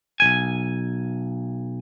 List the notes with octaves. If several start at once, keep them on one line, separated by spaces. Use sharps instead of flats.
B1 F2 G#5